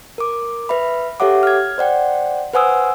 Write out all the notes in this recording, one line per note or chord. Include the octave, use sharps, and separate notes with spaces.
A#4 D6
B4 E5 B5
G4 A4 C#5 E5 F#5 D6
F6 G#6
C5 D5 F#5 G5
B4 C5 F#5 G#5 D#6 E6